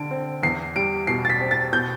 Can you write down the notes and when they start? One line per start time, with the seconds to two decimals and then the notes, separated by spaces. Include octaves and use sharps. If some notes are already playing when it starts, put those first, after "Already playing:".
Already playing: D3 D7
0.11 C4
0.43 E2 C7
0.76 G3 D7
1.07 B2 C7
1.25 A6
1.30 B6
1.41 C4
1.51 A6
1.73 B2 G6